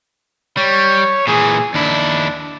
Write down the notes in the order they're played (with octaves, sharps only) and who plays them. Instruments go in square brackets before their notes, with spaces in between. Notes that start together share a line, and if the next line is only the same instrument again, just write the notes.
[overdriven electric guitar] G3 [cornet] C#5
[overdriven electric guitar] A#2 E3 [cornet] G#4
[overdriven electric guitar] D#2 E4 [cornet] D4